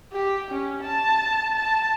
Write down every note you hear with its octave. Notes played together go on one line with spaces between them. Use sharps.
G4
C#4
A5
A5